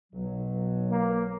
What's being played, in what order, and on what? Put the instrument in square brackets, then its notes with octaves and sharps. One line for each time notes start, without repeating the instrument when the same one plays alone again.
[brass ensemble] B1 [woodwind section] F#3
[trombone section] A#3